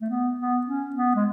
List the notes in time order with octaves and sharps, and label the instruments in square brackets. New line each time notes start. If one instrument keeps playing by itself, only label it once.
[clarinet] A3
B3
B3
C#4
B3
G#3